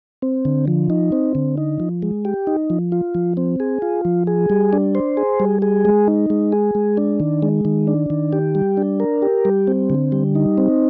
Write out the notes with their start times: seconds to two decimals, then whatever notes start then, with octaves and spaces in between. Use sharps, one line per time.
0.22 C4
0.45 D3
0.68 F3
0.90 D#4
1.12 C4
1.35 D3
1.57 D#4
1.80 F3
2.02 G#3
2.25 G4
2.47 D#4
2.70 F3
2.92 F4
3.15 F3
3.37 C4
3.60 G#4
3.82 F4
4.05 F3
4.27 G#4
4.50 G3
4.73 D4
4.95 C5
5.17 G#4
5.40 G3
5.62 G#4
5.85 G#3
6.08 D#4
6.30 G#3
6.52 G#4
6.75 G#3
6.97 D4
7.20 D#3
7.42 G#3
7.65 D#3
7.87 D4
8.10 D#3
8.33 G4
8.55 G3
8.77 D4
9.00 A#4
9.22 G4
9.45 G3
9.67 C4
9.90 D3
10.12 G3
10.35 D#4
10.58 C4